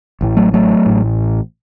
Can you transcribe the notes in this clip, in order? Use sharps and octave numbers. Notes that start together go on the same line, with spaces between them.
A1 A2
F#3 A3
F#3 A3
A1 A2